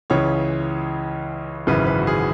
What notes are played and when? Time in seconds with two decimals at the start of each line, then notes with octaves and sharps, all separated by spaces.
0.10 C#2 C#3 E3 C#5
1.67 G#1 F#2 C#3 E3 B4
1.87 B4
1.98 F#4
2.07 G#4